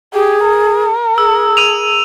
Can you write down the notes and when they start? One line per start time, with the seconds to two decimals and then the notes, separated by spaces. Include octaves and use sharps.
0.14 G4 G#4
0.46 A#4
1.18 G#4 E6
1.57 E6 D#7 F7